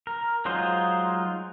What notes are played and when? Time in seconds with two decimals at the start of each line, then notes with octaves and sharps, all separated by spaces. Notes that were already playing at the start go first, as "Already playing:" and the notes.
0.07 A#4
0.45 F#3 G#3 D#4 F4 C5